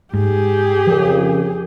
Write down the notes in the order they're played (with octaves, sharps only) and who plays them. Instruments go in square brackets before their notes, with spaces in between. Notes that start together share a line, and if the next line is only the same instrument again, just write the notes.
[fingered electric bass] G#2 [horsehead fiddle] G4 G#4
[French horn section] F2 C#3 A#4 [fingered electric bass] F3